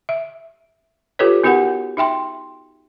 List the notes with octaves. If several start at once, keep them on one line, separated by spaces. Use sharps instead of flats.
E5
F4 G4 A4 B4 C#5
B3 D#4 F#4 G4 A#4 F#5
D#4 E5 G5 C6